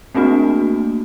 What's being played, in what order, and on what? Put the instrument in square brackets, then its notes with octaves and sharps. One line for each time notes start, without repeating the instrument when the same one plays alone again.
[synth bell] A3 A#3 C4 D4 F#4